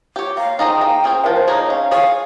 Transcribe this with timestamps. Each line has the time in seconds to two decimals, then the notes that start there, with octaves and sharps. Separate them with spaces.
0.16 G4 C#5
0.37 A#3 F5
0.59 D#4 G#4 C5 D#5 G5
0.81 A#3
1.04 C#4 G#4 C5
1.24 F3 A#4
1.36 C5
1.48 A#3 D#4 G#4 C#5
1.58 D#5
1.69 C#4 F5
1.91 G#4 C#5 F5